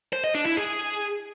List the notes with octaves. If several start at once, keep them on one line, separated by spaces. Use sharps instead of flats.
C5
D#5
D4
E4
G#4